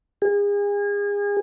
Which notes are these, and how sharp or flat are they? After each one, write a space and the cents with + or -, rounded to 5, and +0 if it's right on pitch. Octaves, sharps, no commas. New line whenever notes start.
G#4 -35